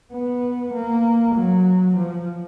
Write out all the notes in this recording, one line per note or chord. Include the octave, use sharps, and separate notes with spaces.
B3
A#3
F#3
F3